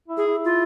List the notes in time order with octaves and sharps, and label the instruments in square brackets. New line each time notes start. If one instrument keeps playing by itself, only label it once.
[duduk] E4
[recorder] G#4
[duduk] E4
[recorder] F4